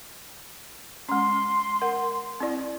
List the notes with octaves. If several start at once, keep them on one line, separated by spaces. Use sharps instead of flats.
G#3 C#4 C6
A#4 F#5
C4 E4 D5